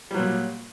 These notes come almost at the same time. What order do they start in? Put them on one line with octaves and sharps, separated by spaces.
G3 F#3 A#2